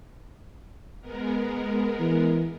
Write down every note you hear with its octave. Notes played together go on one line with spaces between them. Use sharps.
G#3 B3 A#4
E3